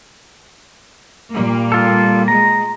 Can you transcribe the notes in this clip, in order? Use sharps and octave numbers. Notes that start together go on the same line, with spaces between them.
A#2 G3 A#3
F4 A4
G#3 A#5